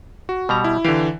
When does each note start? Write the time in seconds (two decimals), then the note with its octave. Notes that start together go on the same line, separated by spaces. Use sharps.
0.29 F#4
0.49 B2 G3 A#5
0.64 E4
0.85 D3 E3 G4 F5